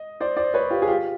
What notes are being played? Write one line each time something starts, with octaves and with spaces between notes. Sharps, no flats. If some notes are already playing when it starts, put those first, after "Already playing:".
Already playing: D#5
C5 D5
C5 D5
B4 C#5
F4 G4
G#4
F4 G4